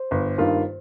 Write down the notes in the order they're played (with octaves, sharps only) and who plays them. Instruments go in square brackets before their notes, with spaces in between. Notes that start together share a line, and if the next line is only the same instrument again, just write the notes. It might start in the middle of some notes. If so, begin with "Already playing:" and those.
Already playing: [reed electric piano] C5
[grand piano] G1
G2 D#3 A#3 F4